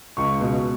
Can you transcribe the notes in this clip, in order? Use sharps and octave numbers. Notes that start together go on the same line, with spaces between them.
C#2 C#6
B2